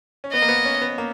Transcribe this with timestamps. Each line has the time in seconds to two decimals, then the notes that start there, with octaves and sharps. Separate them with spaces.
0.24 C#4
0.33 B3 D#5
0.42 A#3
0.49 B3
0.65 C#4
0.81 B3
0.98 A#3